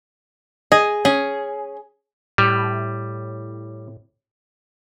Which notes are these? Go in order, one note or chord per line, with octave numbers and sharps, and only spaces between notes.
G#4 D#5
C#4 G#4
A2 G3